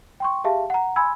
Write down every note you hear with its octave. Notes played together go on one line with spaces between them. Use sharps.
G5 C6 C#6
G4 G#4 E5 F5 A5
F#5 A#5
G#5 B5 C6 E6 G#6